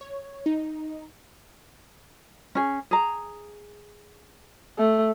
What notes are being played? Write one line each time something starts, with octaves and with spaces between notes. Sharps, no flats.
C#5
D#4
C#4 G#4
G#4 A#5
A3